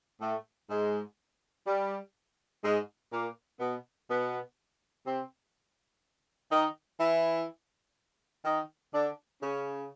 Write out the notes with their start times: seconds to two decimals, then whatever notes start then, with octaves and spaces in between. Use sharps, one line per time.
0.20 A2 A3
0.69 G#2 G#3
1.66 G3
2.63 G#2 G#3
3.11 A#2 A#3
3.59 B2 B3
4.08 B2 B3
5.05 C3 C4
6.51 D#3 D#4
6.99 E3 E4
8.45 D#3 D#4
8.93 D3 D4
9.41 C#3 C#4